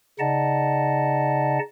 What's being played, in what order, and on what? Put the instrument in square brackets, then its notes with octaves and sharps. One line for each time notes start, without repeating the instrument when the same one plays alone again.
[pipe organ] C#3 D#4 D5 D#5 F#5 A5